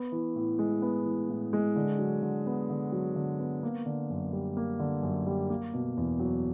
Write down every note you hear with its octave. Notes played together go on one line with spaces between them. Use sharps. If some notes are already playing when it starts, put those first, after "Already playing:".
Already playing: B3
E3
A2
G#3
B3
E3
A2
G#3
D3
F#3
D3
B3
D3
F#3
D3
B3
A#3
D3
F#2
G3
A#3
D3
F#2
G3
A#3
B2
E2
F#3